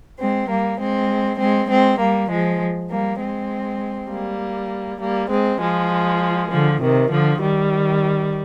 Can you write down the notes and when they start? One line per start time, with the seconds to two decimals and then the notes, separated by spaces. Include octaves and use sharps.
0.19 G#3 C4
0.49 G3 A#3
0.79 G#3 C4
1.39 G#3 C4
1.69 G#3 C4
1.99 G3 A#3
2.30 F3 G#3
2.90 G3 A#3
3.20 G#3 C4
4.10 G3 A#3
5.01 G3 A#3
5.30 G#3 C4
5.61 F3 G#3
6.51 D3 F3
6.81 C3 D#3
7.11 D3 F3
7.41 D#3 G3